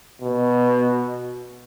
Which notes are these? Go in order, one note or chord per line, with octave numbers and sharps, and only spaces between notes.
B2